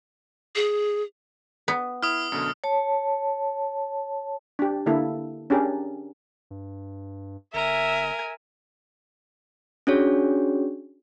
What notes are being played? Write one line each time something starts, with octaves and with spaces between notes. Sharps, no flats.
G#4
B3
E4 D#6 F6
F#2 B2 D3
C#5 A5
D4 G4
D3 A#3 E4 A4
C#4 D4 G4 G#4 A#4
G2
G1 A#4 E5 G#5
C#4 D4 F#4 G#4 C#5